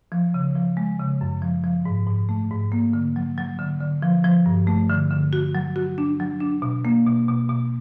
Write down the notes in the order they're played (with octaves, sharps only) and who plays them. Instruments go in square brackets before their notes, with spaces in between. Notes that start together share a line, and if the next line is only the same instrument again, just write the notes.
[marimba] F3
C#3
F3
G#3
C#3
F#2
F3
F3
G#2
G#2
A3
G#2
A#3
D3
F#3
F#3
D3
D3
F3
F3
G2
A3
D3
D3
F#4
F#3
F#4
D4
F#3
D4
B2
A#3
B2
B2
B2